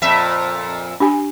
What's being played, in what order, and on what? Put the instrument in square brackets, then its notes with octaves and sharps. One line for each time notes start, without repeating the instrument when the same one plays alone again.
[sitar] F2 A#2 E5
[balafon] D4 G4 G#5